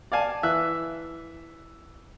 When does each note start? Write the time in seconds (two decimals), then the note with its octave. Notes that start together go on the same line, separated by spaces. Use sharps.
0.12 D5 F5 G#5 A5
0.43 E3 E5 F#6